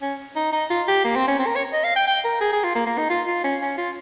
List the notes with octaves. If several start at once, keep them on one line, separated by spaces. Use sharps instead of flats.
C#4
D#4
D#4
F4
G4
A#3
C4
C#4
C4
A#4
C#5
D#5
F5
G5
G5
A#4
G#4
G#4
F4
A#3
A#3
D#4
F4
F4
C#4
C#4
F4